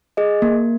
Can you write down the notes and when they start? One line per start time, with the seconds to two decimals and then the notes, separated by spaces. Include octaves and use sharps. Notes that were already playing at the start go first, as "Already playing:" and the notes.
0.17 G#4 D#5
0.42 A#3